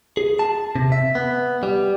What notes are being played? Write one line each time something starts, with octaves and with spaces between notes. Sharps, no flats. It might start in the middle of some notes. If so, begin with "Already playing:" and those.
G#4
A5
C3
E5
B3
G3